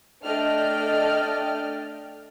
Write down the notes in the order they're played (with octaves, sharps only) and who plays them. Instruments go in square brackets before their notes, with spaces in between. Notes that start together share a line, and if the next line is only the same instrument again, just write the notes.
[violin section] A3 D4 D5 D#5 G5 F6